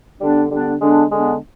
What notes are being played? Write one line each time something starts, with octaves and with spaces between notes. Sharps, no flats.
D3 G3 B3 D4
D3 G3 B3 D4
D3 G#3 B3 D4
D3 G#3 B3 D4